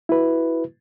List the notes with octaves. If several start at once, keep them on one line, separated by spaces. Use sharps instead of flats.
E4 F#4 B4